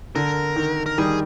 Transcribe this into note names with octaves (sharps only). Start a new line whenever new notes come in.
D3 A#4
D#3
A#4
D#3 G3 G#4